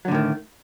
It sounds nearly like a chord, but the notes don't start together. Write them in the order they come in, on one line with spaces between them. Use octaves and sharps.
F#3 D3 A2 D#3